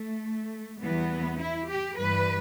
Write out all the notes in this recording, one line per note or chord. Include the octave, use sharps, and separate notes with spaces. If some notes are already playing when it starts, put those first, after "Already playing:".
Already playing: A3
E2 E3 G3 B3
E4
G4
G2 E3 G3 B4